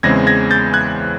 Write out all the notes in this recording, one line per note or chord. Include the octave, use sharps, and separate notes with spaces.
E2 C#3 E3 G#3 C4 G#6 A#6
G#6 A#6
G6 A6
F#6 G#6